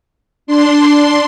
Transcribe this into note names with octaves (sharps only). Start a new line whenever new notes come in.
D4 C6